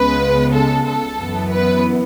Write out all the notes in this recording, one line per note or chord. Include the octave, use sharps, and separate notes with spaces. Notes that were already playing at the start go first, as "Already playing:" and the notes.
Already playing: C#2 C#3 G#3 B3 B4
A4
A4
F#2 E3 B3
B4